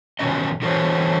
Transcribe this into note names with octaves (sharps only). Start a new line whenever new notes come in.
C3 D#3 E3 F#3 C#4 D#5
D3 E3 F#4 A4 C5 C#5